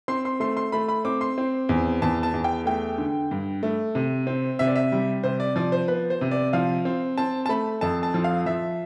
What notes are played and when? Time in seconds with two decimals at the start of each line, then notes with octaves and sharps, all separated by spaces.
0.08 C4 C6
0.25 C6
0.40 A3 C6
0.57 C6
0.72 A3 B5
0.88 B5
1.05 C4 D6
1.21 C6
1.38 C4
1.69 E2
2.02 E2 A5
2.23 A5
2.34 E2
2.44 G5
2.66 A3 G5
2.98 D3
3.31 G2
3.63 A3
3.95 C3
4.27 C4
4.59 C3 E5
4.67 D5
4.76 E5
4.92 G3
5.23 C3 C5
5.40 D5
5.56 F3 D5
5.72 C5
5.88 B3 B4
6.10 C5
6.21 C3
6.31 D5
6.53 F3 F5
6.85 C4
7.18 C4 A5
7.46 A5
7.49 A3 B5
7.81 F2 A5
8.03 A5
8.14 F3
8.24 F5
8.46 F3 E5